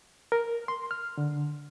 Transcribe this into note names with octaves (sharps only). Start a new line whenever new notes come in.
A#4
C6
F6
D3